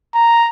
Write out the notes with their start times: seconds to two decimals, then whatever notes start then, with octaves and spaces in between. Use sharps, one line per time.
0.14 A#5